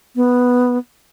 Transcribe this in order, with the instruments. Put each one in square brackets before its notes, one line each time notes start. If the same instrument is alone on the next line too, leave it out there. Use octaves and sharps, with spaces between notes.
[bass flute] B3